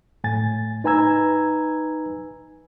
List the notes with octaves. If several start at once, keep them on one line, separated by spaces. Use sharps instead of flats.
A2 G#5 A6
D#4 B4 G#5 A#5 E6 G#6